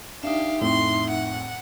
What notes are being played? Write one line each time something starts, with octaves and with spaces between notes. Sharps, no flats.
D4 D#4 G4 E5 F5
F2 A2 C6
F#5